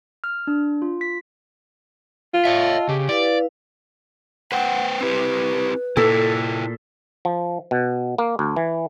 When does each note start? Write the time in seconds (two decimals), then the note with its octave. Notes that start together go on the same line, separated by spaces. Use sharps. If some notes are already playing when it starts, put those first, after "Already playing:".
0.24 F6
0.47 D4
0.82 F4
1.01 B6
2.33 F4
2.45 C#5 D#5 E5 A5 E6
2.89 C#3 G4
3.09 E4 B4 D5 F5
4.52 B4 C5 F#5 G5
5.01 C4 E4 G4 B4
5.97 A#2 A#3 E4 A4
7.25 F3
7.71 B2
8.18 A#3
8.39 D2
8.56 E3